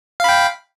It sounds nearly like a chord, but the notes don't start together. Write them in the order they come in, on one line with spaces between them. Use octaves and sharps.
F5 B5 G5